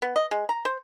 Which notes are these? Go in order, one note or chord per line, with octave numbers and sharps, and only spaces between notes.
B3
D#5
G#3
A#5
C5